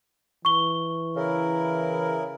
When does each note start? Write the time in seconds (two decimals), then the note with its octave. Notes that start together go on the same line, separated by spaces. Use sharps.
0.45 E3 C#6 G7
1.16 C#3 E4 A#4